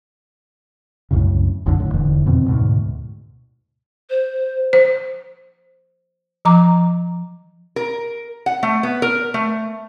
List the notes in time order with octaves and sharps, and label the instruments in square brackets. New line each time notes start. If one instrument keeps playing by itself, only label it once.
[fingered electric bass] C2 F#2 A2 C#3
F1 B1 F#2 D3
A2 D3
D#1 E2 D3 E3
F2 B2 D#3 C4
D2 G#2 B2 D3
[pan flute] C5
[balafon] C5
F3 A#5 D6
[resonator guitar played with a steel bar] A#4
F#5
A3
B3
A#4
A3